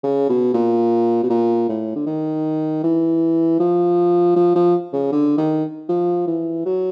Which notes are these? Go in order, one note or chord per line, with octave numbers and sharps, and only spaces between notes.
C#3
B2
A#2
B2
A#2
A2
D3
D#3
E3
F3
F3
F3
C#3
D3
D#3
F3
E3
F#3